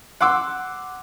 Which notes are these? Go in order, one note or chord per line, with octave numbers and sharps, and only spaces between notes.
F#5 C6 D6 E6